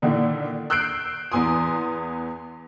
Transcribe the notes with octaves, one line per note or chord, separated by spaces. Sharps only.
A#2 D3 D#3 D4 E4
E6 F#6 G6 C7 D7
E2 E3 B3 G#5 C6 D#6